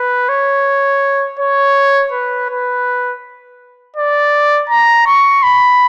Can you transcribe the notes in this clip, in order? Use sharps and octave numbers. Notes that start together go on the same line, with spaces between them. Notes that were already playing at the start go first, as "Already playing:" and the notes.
Already playing: B4
C#5
C#5
B4
B4
D5
A#5
C#6
B5